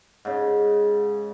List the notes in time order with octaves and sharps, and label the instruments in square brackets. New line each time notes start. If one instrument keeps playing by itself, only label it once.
[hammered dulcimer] G#2 C#3